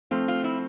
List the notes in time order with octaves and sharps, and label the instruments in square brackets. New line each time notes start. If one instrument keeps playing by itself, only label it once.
[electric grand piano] F3 A3 C4 [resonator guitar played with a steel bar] F4
[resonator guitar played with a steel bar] F4
E4